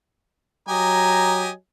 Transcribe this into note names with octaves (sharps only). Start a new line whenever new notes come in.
F#3 G4 D#5 G#5 A#5